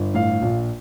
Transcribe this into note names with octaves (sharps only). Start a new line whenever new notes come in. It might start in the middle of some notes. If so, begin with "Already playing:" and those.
Already playing: G1
A2 F5
A#1